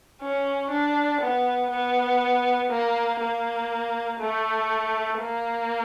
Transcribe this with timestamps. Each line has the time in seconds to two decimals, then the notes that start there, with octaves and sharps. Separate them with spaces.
0.22 C#4
0.71 D4
1.21 B3
1.70 B3
2.71 A#3
3.20 A#3
4.20 A3
5.19 A#3